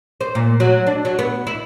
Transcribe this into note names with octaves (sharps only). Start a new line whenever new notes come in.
C5
A#2
F#3
D4
F#3
B3
E4